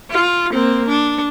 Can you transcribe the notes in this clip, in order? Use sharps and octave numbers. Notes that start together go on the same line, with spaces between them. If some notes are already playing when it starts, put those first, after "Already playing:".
F4
A#3 C4
D4